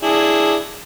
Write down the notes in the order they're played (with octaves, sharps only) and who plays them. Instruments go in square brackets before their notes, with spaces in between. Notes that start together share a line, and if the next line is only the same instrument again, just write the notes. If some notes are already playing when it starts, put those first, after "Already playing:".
[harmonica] D4 E4 G#4